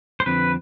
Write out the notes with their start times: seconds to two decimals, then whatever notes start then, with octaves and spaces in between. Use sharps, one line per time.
0.20 C5
0.26 F2 D3 F3 C4 B4